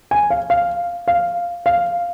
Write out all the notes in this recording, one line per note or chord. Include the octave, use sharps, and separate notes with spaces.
G#5
F5
F5
F5
F5